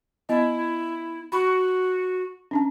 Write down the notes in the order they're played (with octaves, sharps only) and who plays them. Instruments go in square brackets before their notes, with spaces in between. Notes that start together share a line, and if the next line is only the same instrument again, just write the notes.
[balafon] B3 D#5 [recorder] E4
[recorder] F#4 [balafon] B5 C#6
[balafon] C#4 D4 A5